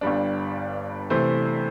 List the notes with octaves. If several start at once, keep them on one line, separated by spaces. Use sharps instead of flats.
G1 G2 G3 D4
C3 E3 A3 E4 C5